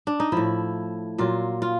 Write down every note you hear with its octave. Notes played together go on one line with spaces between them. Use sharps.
D4
D#4
A2 F3 E4
A#2 F#3 F4
F4